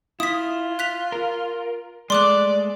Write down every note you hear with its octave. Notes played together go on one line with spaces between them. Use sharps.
E4 F4 D#6 B6
F#6 B6 F7
A#4
G#3 A3 D5 C6 D6 F#6